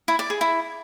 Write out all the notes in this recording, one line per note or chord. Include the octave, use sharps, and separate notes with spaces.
E4
D5
G#4
E4